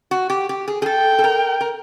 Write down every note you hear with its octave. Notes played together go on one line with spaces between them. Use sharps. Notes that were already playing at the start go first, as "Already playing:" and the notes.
F#4
G4
G4
G#4
G#4
A4 G5
A4
A#4
A#4